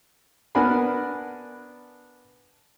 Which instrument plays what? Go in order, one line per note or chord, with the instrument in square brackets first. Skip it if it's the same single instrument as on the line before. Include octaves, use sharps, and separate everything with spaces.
[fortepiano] B3 D4 A#4 F#5 G#5 B5